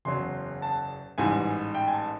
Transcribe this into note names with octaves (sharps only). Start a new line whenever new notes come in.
F#1 E2 C#3 F#3 C6
A5
A1 G#2 E3 G3 G#5
G5
G#5
A5